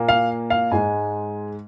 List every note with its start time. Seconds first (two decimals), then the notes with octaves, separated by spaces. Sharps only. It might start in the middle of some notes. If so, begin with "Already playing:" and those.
Already playing: A#2 A#3
0.09 F5
0.50 F5
0.71 G#2 G#3 G#5